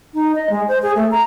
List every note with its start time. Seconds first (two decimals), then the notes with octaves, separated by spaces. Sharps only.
0.14 D#4
0.35 D#5
0.50 G#3
0.68 C5
0.82 G#4
0.95 A3
1.11 A#5